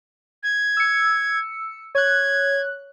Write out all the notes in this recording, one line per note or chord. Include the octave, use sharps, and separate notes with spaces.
G#6
E6 C#7
C#5 F#6 G#6